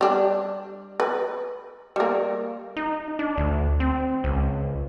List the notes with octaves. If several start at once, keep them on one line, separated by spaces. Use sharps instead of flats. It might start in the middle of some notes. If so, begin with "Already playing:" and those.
G3 D4
B4
G3 A#3
D#4
D4
D2
C4
C#2